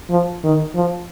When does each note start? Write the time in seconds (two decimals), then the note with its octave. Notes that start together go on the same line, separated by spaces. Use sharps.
0.10 F3
0.44 D#3
0.75 F3